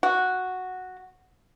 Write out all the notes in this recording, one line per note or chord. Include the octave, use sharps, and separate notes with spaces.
F#4